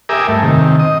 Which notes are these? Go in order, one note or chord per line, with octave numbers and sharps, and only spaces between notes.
G4 A#4 E5 G#5 D6 D#6
G2 A3
C3 D#3
D#5